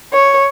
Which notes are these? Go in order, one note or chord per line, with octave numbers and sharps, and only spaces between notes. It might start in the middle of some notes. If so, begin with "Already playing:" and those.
C#5